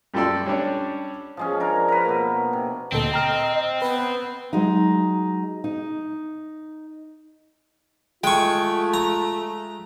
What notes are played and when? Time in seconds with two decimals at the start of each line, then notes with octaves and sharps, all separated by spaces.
0.14 F#2 G3 F4 A4 D5 C6
0.46 G3 C#4 D4 C#5
1.37 F3 G#3 C#4
1.60 D4 A#4 C#5
1.88 A#4 B4
2.05 B2 A#3
2.53 C3
2.92 D2 A#2 C4 A4 D#5
3.12 G5 A#5 F6
3.82 B3 B4
4.53 F#3 G#3 D#4
5.64 D#4
8.24 G#3 A3 F4 G5 C#6
8.94 A#5